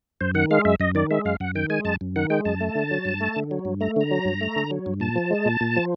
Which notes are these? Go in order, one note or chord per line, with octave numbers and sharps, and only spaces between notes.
F#2 C5
D#3 F#5
G#3 F5
F#2 E5
F#2 D#5
D#3 D5
G#3 E5
F#2 F5
F#2 F#5
D#3 G5
G#3 G#5
F#2 A5
F#2
D#3 F#5
G#3 G5
F#2 A5
A3
D3
F#3
G2
A3
D3
F#3
G2
A3 A#5
D3 A#5
F#3
G2
A3
D3
F#3
G2
A#2 A5
F3
G#3
A#2
A#2
F3